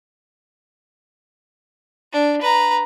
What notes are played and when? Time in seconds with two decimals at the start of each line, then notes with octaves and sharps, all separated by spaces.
2.13 D4
2.42 B4 A#5